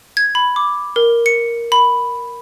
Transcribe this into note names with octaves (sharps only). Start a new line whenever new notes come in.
G#6
B5
D6
A#4
C#7
B5